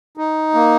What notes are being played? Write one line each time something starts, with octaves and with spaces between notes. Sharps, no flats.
D#4
A#3